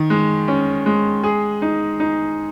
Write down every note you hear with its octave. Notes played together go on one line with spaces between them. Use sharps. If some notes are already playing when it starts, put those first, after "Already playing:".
Already playing: D#3
G#3
C#4
G#3
G#4
D#4
D#4